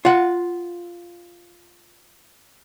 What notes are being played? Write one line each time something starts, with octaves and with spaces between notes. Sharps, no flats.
F4 F#5